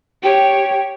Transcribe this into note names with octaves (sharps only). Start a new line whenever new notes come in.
G4 C#5 G5